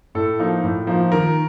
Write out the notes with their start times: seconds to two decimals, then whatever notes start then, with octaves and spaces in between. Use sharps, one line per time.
0.15 A2 A4
0.39 F3 A#3 D#4
0.64 A2
0.87 F3 A#3 D#4
1.12 D#3 A#4